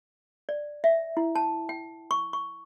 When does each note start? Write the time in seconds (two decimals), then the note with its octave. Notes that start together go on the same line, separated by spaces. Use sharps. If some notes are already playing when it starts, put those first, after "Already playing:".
0.49 D5
0.84 E5
1.17 E4
1.35 A5
1.69 G5
2.11 C#6
2.33 C#6